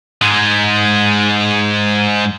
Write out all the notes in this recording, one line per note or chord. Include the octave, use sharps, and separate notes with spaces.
G#2 G#3